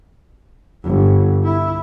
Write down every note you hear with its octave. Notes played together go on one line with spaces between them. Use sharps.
G1
E4